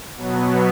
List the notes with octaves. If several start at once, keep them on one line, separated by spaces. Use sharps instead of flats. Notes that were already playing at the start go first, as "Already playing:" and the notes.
B2 F#3 B3